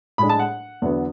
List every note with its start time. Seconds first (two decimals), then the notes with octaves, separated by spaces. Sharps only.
0.18 A2 G#3 D4 B5
0.29 A5
0.39 F#5
0.82 E2 D3 F#3 B3